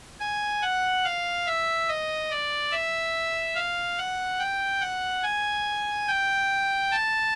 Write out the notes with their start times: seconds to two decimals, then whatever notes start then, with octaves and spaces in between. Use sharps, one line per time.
0.20 G#5
0.62 F#5
1.04 F5
1.46 E5
1.89 D#5
2.31 D5
2.72 E5
3.55 F5
3.98 F#5
4.39 G5
4.81 F#5
5.23 G#5
6.08 G5
6.91 A5